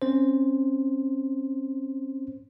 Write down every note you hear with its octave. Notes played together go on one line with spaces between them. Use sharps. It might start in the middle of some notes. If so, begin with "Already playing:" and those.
C4 C#4 C5